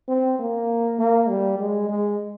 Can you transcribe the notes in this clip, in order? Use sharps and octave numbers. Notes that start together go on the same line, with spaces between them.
C4
A#3
A#3
G3
G#3
G#3